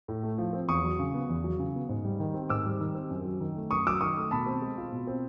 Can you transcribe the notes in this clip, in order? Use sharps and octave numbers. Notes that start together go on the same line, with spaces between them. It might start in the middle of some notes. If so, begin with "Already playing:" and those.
A2
A3
F3
C4
E2 C#6 D#6
F#3
C#3
B3
E2
F#3
C#3
B3
G#2
G3
D#3
C4
G#2 D6 E6
G3
D#3
C4
F#2
F#3
D#3
A3
F#2 C#6 D#6
F#3 D6 E6
D#3 C#6 D#6
A3
B2 A5 B5
C4
G#3
F4
B2
C4